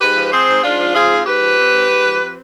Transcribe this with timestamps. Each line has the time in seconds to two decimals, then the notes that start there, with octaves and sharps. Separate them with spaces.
0.01 G#2 G4 B4
0.16 F3
0.32 C4 G#4 C5
0.48 G#2
0.64 G#2 D4 F4
0.79 F3
0.95 C4 F4 G#4
1.11 G#2
1.26 G#2 G4 B4
1.42 F3
1.58 C4
1.74 G#2
1.89 G#2
2.04 F3
2.21 C4